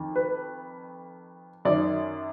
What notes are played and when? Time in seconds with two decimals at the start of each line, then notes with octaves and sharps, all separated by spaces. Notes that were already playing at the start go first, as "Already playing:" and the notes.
Already playing: F2 D#3
0.16 B4
1.65 F#2 D#3 D5